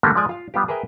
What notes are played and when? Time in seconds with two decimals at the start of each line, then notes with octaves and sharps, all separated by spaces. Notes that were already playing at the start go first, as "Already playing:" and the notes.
0.03 D3 E3 G3 A3 A#3
0.15 F3 G#3 D5 G#5
0.29 F4 F5
0.54 G3 B3 F4 G4
0.68 G#4 A#4 B4 E5 G5